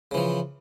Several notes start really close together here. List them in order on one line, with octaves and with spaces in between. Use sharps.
C#3 E3 F3